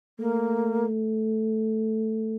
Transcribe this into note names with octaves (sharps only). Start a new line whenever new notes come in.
A3 A#3